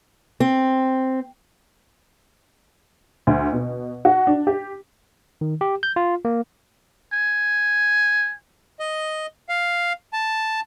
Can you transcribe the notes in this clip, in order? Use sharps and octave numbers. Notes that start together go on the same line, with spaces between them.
C4
D2
B2
F#4
D4
G4
D#3
G4
G6
F4
A#3
G#5
D#5
F5
A5